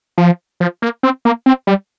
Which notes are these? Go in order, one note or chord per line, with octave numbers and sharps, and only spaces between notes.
F3
F3
A#3
C4
A#3
C4
G3